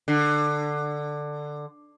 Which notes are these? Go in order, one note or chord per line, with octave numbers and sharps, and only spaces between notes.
D3